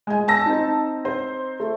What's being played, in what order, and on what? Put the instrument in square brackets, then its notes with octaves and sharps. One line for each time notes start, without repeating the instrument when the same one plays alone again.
[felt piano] G#3 G#5
[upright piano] A5 E6 A#6
[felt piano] C4 D#4
[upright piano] C5
[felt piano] A3